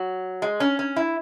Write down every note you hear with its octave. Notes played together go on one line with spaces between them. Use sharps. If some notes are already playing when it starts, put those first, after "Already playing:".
Already playing: F#3
G#3
C#4
C#4
E4